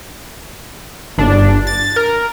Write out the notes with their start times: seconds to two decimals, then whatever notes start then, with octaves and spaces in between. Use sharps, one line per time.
1.18 G1 D4
1.67 A6
1.96 A#4